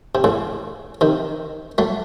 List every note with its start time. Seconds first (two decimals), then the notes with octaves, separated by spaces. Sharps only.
0.15 C3
0.24 A2 C#3
1.01 C3 D#3
1.78 F#3 A3